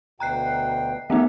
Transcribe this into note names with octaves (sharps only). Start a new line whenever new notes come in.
D2 B2 G5 A#5 F#6 C7
A3 B3 D#4 A#4 E5 F#5